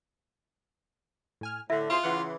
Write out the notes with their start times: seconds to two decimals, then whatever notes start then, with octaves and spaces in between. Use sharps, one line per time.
1.41 A2 G#5 F6
1.70 A2 D3 E4 E5
1.90 B2 F4 G#4 C5
2.03 C#3 E3 F#5 C6